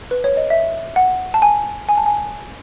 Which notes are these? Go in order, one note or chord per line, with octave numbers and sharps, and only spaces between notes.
B4
C#5
D#5
E5
F#5
A5
G#5
G#5
A5
G#5